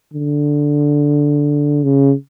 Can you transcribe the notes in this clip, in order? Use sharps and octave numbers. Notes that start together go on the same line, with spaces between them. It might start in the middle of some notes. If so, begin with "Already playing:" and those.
D3
C#3